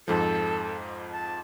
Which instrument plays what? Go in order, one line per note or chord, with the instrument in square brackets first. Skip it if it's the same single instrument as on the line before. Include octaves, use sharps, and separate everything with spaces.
[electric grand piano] F2 G#2 F3 [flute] A4
[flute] A5